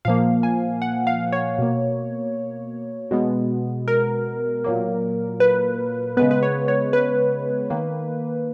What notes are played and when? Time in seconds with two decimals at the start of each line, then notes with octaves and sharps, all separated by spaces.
0.05 A#2 F3 A#3 F5
0.43 G#5
0.82 F#5
1.07 F5
1.32 C#5
1.59 B2 A#3
3.11 B2 G#3 B3
3.88 A#4
4.64 A#2 F#3 A#3
5.40 B4
6.17 C#3 G#3 B3 B4
6.31 B4
6.43 C#5
6.68 C#5
6.93 B4
7.70 D#3 A#3